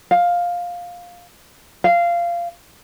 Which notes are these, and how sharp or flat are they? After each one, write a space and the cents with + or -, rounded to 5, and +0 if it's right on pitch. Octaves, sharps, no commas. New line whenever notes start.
F5 +10
F5 -15